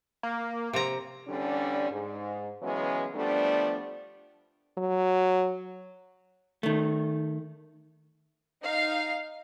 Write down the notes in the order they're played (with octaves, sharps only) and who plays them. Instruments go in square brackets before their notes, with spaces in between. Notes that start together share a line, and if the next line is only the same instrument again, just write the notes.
[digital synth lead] A#3
[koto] C3 A#5
[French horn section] E2 D3 G3 C#4 D4
G#2
C#3 E3 F#3 G#3 B3 C#4
F3 G3 A3 B3 D4
[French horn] F#3
[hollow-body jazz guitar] D#3 A3
[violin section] D#4 F5 C7